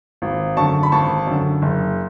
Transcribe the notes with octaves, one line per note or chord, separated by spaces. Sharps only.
G#1
F#2 D3 A5 C#6
B5
G#1 A5 C#6
F#2 D3
F#1